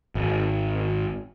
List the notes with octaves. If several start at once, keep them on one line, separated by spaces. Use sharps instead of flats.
G#1